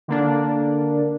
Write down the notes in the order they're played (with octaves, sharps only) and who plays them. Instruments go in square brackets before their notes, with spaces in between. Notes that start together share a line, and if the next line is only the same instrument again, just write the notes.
[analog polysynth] D3 A#3 D4